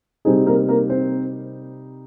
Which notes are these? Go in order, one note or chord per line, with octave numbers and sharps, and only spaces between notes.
C3 G3 C4 D#4 G#4
A#3 A#4
A#3 A#4
C4 C5